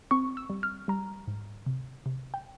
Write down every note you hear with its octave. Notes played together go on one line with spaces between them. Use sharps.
C4 C#6
E6
G3
F6
G3 A#5
G#2
C3
C3
G5